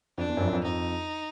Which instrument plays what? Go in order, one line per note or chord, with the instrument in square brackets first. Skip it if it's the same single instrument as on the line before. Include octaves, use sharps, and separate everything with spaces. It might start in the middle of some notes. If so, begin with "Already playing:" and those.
[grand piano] F2 [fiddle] D4
[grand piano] E2
F#2
F2
F#2
F2
[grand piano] F2 [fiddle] D#4